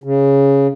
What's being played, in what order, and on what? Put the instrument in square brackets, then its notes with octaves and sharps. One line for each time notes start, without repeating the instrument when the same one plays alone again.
[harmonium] C#3